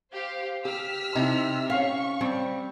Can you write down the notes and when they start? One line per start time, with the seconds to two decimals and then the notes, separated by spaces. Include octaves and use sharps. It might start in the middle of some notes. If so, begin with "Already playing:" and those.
0.12 G4 C5 F5
0.65 G4 E6 F6 B6
1.15 C3 D#4 E4
1.70 C#4 F5 C#6 B6
2.21 G3 C4